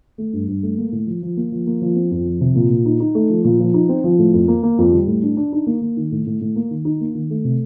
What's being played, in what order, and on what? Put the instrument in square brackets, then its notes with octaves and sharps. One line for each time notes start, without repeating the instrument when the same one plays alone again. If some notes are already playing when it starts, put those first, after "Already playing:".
[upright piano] A3
G2
G2
A3
A#3
A2
F3
F3
A#3
F3
A#3
F3
C4
F2
F3
C3
A#2
A#2
D#4
D#4
A3
F3
A#2
F3
D#4
C4
F3
A2
F2
A#3
A#3
F2
G3
A2
D4
D4
D#4
A#3
A#3
D#3
A2
A2
A2
A#3
D#3
D#4
A#3
D#3
A3
C3